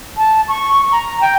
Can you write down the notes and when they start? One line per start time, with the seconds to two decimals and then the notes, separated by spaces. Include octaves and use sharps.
0.17 A5
0.48 C#6
0.92 A#5
1.21 G5